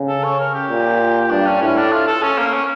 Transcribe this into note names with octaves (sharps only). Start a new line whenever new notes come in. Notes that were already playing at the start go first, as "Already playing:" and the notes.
Already playing: C#3
A4
C#5
A#4
G4
A#2
G2 D4
C#4
A2 C#4
D4
F4
A4
C#4
A#3
C#4